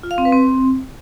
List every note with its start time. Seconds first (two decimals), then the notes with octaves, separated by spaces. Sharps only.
0.03 F4
0.11 F5
0.18 C4
0.25 B4
0.33 C4